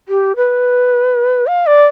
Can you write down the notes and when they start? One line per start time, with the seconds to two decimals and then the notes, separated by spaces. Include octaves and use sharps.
0.08 G4
0.36 B4
1.47 F5
1.66 D5